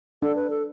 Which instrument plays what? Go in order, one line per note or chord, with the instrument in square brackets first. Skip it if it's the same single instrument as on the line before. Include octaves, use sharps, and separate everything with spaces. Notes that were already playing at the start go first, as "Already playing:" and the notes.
[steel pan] D4 [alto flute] A4
[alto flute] B4
A4